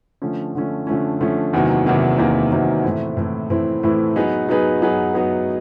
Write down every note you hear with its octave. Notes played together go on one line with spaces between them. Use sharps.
D3 F3 A3 C#4
D3 F3 A3 C#4
D3 F3 A3 C#4
D3 F3 A3 C#4
E2 C3 D#3 F#3 A#3
E2 C3 D#3 F#3 A#3
E2 C3 D#3 F#3 A#3
E2 C3 D#3 F#3 A#3
A2 E3 A3 C4 E4
A2 E3 A3 C4 E4
A2 E3 A3 C4 E4
A2 E3 A3 C4 E4
F#3 B3 D#4 G#4 B4
F#3 B3 D#4 G#4 B4
F#3 B3 D#4 G#4 B4
F#3 B3 D#4 G#4 B4